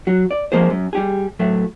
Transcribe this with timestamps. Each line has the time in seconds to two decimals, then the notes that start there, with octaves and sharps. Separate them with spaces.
0.07 F#3 F#4
0.31 D5
0.52 F3 G#3 A#3 G#4 C5
0.70 F#2
0.93 G3 G4 G#4
1.39 A2 F#3 A3